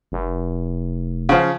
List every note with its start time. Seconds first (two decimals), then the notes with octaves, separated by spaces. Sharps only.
0.12 F1
1.29 C#3 F3